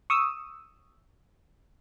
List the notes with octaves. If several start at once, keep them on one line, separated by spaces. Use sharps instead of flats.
C#6 D#6 E6